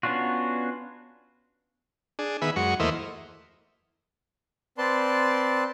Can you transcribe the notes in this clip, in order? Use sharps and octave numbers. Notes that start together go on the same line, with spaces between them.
B3 C#4 D4 F4 F#4
D4 G#4
D#3 B3 G#4 E5 B5
F#2 G#3 F#4 C#6
E2 A3 A#3 E4 C5 D#5
C4 B4 D5 A5 C6